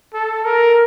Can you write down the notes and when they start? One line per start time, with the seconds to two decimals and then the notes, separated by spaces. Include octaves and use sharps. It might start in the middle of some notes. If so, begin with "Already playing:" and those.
0.14 A4
0.45 A#4